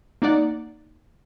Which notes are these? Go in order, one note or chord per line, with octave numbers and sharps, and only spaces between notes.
A#3 D#4 D5 F#5